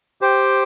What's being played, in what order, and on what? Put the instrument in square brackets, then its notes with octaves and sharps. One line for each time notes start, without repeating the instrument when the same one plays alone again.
[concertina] G4 C5 G5